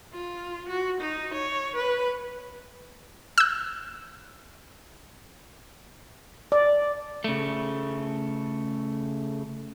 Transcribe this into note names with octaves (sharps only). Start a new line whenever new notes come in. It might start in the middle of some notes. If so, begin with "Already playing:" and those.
F4
F#4
D#4
C#5
B4
E6 F#6
D5
C#3 A3